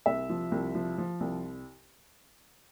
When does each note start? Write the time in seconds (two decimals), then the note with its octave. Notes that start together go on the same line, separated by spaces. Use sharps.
0.06 C2 E5
0.30 F3
0.52 C2
0.75 F3
0.98 F3
1.20 C2